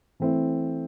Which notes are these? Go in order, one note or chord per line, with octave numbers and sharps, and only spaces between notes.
E3 A3 C4 E4